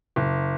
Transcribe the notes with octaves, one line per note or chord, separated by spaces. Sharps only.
F#1